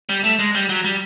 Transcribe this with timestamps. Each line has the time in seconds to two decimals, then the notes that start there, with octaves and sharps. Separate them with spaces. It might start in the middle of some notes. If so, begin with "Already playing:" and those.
0.09 G3
0.24 A3
0.39 G#3
0.55 G3
0.69 F#3
0.84 G3